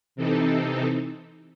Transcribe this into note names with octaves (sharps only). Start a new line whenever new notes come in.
C3 E3 C4 D#4 A4